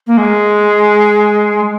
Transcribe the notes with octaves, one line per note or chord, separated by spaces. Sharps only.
A#3
G#3